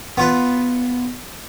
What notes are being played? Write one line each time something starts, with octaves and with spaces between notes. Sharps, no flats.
B3 F4 B4